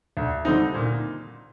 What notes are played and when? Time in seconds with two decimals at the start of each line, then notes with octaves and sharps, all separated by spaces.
0.17 D2
0.45 D3 G3 C4 D#4
0.74 A#2